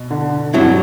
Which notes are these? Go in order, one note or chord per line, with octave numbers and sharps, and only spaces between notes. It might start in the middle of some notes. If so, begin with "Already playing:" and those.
Already playing: B2
D3
G2 F#3 C4 E4